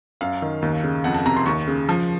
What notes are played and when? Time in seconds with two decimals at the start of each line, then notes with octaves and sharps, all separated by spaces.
0.21 F#2 F5
0.42 D#3
0.62 D#2
0.84 C#3
1.04 F2 F#5
1.14 A5
1.26 C3 A#5
1.36 C6
1.46 D#2 C#6
1.67 C#3
1.89 F3